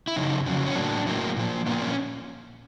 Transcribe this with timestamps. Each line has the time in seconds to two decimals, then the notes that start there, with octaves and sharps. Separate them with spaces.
0.08 E4
0.16 F2 C#3 F#3 D#4
0.46 F2 C#3 F#3
0.66 C#4
0.75 A2 F#3 A#3 D4
1.06 A2 F#3 A#3
1.36 A#2 F3 A#3
1.66 A#2 F3 A#3 B3
1.82 C#4